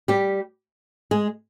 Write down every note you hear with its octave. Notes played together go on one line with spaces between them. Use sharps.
G3 G4
G#3 G#4